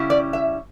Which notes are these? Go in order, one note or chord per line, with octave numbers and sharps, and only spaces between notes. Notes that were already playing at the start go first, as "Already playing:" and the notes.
Already playing: C#3 G3 C#4 E4
D5
E5